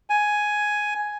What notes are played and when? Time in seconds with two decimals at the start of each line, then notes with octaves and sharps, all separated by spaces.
0.10 G#5